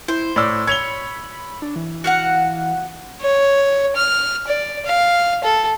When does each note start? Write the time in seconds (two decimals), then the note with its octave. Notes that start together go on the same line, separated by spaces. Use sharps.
0.08 E4 C5
0.36 A2 C#5 D5 E6
0.67 C#5 B5 G#6 F7 G7
1.62 D4
1.76 E3
2.04 F#4 F5 F#5
3.21 C#5
3.96 F6
4.47 D5
4.86 F5
5.43 A4